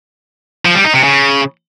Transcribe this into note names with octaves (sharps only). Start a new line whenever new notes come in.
F3
G3
D#4
C3
C#3